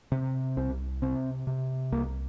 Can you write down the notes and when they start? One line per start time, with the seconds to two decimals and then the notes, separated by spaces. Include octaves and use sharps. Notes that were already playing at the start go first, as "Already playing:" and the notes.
0.12 C3
0.57 C2 C4
1.02 C3 C4
1.47 C3
1.92 C2 A#3